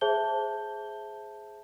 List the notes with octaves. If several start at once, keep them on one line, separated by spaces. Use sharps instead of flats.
G#4 C5 E5 A5 G6 G7